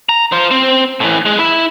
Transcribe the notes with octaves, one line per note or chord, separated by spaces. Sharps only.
A#5
F4 C5
C4
A2 E3
G#3
E4